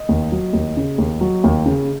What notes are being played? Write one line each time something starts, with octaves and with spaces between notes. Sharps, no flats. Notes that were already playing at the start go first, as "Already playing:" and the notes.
Already playing: D#5
D#2
F#3
D#2
C#3
D#2
F#3
D#2
C#3